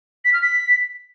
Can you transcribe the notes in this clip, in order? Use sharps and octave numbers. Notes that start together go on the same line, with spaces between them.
B6
F6
B6